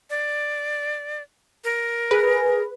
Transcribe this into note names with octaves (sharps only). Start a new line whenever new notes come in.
D5
A#4
G#4 B4